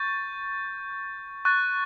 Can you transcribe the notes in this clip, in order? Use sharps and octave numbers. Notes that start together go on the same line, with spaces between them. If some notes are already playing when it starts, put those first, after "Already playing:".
Already playing: C#6 G6 A6
C#6 F#6 A6